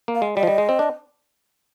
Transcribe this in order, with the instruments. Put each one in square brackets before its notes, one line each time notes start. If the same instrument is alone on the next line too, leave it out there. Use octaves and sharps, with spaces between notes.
[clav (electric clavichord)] A#3
[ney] F5
[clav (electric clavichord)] G#3
[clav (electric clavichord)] G3 [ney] D#5
[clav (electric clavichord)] F3
G3
G#3
C4
D4